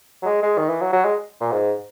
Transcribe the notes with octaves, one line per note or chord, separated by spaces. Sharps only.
F#3
G#3
G#3
D#3
E3
F#3
F#3
G#3
A#2
G#2